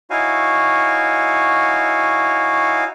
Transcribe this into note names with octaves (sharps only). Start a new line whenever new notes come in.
D#4 E4 F#4 C#5 F5 G#5